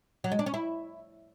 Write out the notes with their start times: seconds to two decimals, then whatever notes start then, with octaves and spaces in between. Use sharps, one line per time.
0.24 F#3
0.32 G#3
0.39 D4
0.46 C#4
0.54 E4